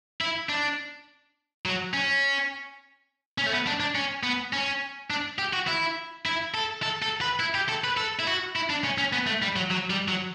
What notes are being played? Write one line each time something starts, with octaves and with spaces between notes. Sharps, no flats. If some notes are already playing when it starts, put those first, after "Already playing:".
E4
D4
F#3
C#4
C#4
A3
B3
D4
D4
C#4
B3
C#4
D4
G4
F#4
E4
E4
A4
A4
A4
B4
E4
G4
A4
B4
A4
E4
F#4
E4
D4
C#4
C#4
B3
A3
G3
F#3
F#3
G3
F#3